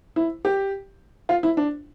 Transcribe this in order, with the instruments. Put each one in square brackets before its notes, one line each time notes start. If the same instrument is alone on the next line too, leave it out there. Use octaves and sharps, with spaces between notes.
[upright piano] E4
G4
F4
E4
D4